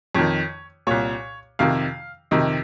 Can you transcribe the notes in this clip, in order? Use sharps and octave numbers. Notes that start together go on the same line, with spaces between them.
F2 D#3 C#5
C2 A#2 C#5
F2 C3 D#3 F5
F2 C3 D#3 D#5